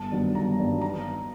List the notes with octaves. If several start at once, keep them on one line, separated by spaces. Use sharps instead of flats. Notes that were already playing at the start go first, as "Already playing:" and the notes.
Already playing: G1 A5
G2 D#3 F#3 B3
G1 A#5
G2 D#3 F#3 B3
A#5